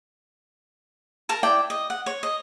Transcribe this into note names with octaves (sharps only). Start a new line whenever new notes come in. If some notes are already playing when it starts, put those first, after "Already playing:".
A#4 A5 A#5
E4 D5 G5
D#5
F#5
C#5
D#5